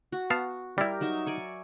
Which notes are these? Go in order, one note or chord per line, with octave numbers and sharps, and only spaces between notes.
F#4
B3 F5 A5
G3 E4 G4 A#4
F#3 D#4 E5
D5 G#5 C#6